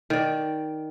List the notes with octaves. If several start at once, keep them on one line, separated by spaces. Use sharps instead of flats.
D#3 D5